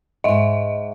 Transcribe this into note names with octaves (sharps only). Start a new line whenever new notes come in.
E2 G#2 D#5 E5